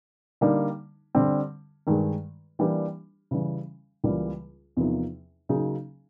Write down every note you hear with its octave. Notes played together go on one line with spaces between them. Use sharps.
D3 G3 A#3 D#4
D3 G3 C4
G2 D#3 G#3
E3 G3 A#3 D4 G4
C#3 E3 G3
C#2 C#3 E3 G3 A#3
E2 C3 F3 A#3 D#4
C#3 F#3 A#3 D#4 G#4